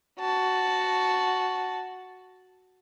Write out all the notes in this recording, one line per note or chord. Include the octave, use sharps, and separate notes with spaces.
F#4 A5